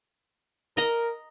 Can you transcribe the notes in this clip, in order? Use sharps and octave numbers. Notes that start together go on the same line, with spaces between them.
A#4 D#5 A#5